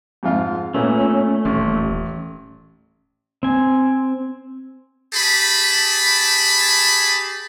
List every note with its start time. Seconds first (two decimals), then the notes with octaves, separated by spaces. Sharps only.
0.23 F2 G#2 F4
0.74 A#2 A3 B3 C#4
1.45 D#1 A1
3.43 C4 G#5
5.14 G4 G#4 A5 B5